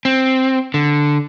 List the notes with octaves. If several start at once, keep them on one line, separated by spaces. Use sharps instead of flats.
C4
D3